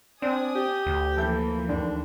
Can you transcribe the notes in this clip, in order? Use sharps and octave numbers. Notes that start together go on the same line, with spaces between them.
C4 D4 D5 G#5 D#6
G4
D2
E3 F3 A#3 A4 E5 G6
D#2 D3 D4